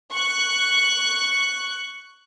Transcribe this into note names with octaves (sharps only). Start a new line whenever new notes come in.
C#6 F#6